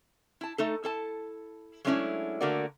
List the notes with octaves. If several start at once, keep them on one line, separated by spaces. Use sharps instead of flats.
E4 A5
A3 D#4 A4
E4 A4 A5
F#3 G#3 A3 C#4 D4 E4
D3 A3 A#3 F#4 A#4 D5